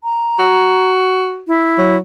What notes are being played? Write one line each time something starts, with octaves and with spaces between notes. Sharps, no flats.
A#5
F#4
E4
F#3